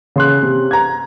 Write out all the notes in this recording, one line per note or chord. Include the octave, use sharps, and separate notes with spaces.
C#3 C6 F#6
C3
A#5 G#6